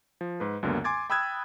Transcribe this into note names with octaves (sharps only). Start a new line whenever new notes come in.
F3
G#2 B4
C#2 F#2 D3 A#3 B3
G#5 C6 D6 G#6 A6
G5 B5 D#6 E6 F#6 G#6